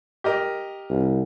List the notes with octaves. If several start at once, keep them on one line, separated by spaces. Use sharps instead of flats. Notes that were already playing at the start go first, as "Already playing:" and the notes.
G4 A#4 D#5
C2